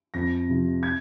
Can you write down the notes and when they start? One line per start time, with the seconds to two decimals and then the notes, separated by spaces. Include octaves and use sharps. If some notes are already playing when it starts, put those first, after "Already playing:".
0.14 F2 A#6
0.48 C3 F3
0.83 G#6